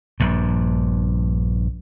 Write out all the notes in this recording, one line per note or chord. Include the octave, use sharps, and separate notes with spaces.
A#1 G2